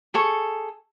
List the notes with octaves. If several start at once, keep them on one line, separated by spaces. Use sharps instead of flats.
G#4 A4 C#6